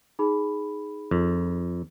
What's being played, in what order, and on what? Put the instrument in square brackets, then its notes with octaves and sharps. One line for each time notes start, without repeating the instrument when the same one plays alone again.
[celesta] D#4 G#4 B5
[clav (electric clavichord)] F2